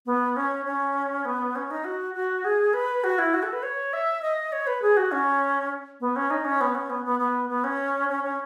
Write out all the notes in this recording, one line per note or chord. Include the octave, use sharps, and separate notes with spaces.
B3
C#4
C#4
B3
C#4
D#4
F#4
F#4
G#4
B4
F#4
E4
F#4
A4
B4
C#5
E5
D#5
C#5
B4
G#4
F#4
C#4
B3
C#4
D#4
C#4
B3
C#4
B3
B3
B3
B3
C#4
C#4
C#4